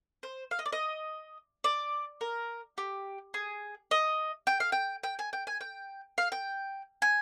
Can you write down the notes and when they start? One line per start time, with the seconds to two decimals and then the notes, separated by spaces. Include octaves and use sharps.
0.23 C5
0.51 F5
0.59 D#5
0.66 D5
0.72 D#5
1.64 D5
2.21 A#4
2.78 G4
3.34 G#4
3.91 D#5
4.47 G5
4.60 F5
4.72 G5
5.03 G5
5.19 G#5
5.33 G5
5.47 G#5
5.61 G5
6.18 F5
6.32 G5
7.02 G#5